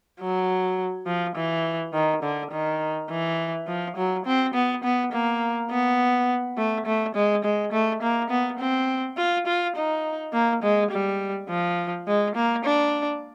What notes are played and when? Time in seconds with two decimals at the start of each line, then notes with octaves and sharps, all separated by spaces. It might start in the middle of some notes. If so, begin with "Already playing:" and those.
0.20 F#3
1.06 F3
1.36 E3
1.93 D#3
2.23 D3
2.51 D#3
3.10 E3
3.67 F3
3.96 F#3
4.26 C4
4.54 B3
4.84 B3
5.12 A#3
5.70 B3
6.57 A3
6.86 A3
7.15 G#3
7.44 G#3
7.72 A3
8.02 A#3
8.30 B3
8.59 C4
9.17 F4
9.47 F4
9.76 D#4
10.33 A#3
10.63 G#3
10.91 G3
11.49 F3
12.08 G#3
12.35 A#3
12.65 D4